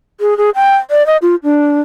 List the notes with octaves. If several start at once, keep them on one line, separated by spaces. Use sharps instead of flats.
G#4
G#4
G5
D5
D#5
F4
D4